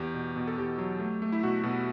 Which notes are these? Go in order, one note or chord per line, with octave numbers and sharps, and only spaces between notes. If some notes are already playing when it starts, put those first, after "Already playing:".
Already playing: E2 G4
B2
B2
A4
E2 G4
F#3
A3
A3
E4
B2 F#4
B2